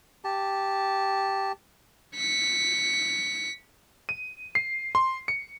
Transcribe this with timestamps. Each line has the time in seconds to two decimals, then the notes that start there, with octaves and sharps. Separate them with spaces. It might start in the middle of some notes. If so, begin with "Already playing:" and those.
0.24 G4 A5
2.16 B6 C#7
4.09 D#7
4.55 C7
4.95 C6
5.28 C#7